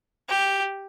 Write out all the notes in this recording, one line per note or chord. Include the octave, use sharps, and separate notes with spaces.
G4